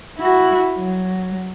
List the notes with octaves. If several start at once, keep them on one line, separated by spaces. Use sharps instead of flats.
E4 F#4
F#3